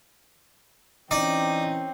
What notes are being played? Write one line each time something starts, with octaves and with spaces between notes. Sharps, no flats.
E3 C4 C#4 D#4 D5